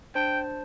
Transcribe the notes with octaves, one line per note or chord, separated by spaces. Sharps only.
D4 C5 G5 A5